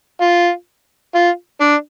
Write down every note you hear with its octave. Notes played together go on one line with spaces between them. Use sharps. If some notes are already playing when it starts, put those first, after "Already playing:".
F4
F4
D4